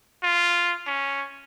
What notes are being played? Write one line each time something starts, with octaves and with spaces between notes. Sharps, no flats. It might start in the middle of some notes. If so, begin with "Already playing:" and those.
F4
C#4